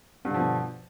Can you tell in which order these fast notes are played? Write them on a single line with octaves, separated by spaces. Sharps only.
G2 D3 F3 B2